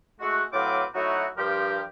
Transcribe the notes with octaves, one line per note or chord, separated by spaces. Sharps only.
G#3 A3 F#4
A2 F#3 C4 B4 F5 D6
F#3 A3 D#4 E4 F#4
G2 F3 G4 A#4